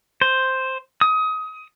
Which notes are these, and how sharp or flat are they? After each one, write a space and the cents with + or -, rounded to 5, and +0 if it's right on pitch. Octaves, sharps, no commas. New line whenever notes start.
C5 +0
D#6 +25